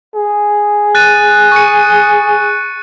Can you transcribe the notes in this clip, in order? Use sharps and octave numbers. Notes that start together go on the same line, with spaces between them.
G#4
F#6 A6 D#7
C#6 C#7